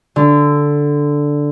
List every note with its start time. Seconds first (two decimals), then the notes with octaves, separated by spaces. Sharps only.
0.16 D3